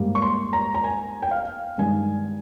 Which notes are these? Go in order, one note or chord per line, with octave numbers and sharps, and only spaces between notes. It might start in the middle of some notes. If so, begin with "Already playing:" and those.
Already playing: G#2 G3 A#3
C#6
C6
A#5
A#5
G#5
G5
F5
G2 D#3 G#3 G#5